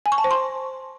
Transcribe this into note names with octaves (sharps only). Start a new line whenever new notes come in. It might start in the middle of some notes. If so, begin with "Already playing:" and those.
G#5
C#6
A5
C5
C6